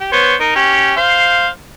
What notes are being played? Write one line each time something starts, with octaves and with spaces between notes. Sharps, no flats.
G4
B3 C5 C#5
D#4 A#4
C#4 G4
C5 F5